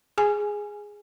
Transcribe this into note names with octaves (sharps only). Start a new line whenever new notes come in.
G#4 G#5